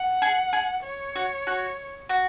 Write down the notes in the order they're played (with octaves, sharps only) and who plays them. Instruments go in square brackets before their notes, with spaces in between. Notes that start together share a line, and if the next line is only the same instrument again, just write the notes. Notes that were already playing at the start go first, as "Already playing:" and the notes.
Already playing: [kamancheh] F#5
[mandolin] G#4
G#4
[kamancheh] C#5
[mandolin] F#4
F#4
F#4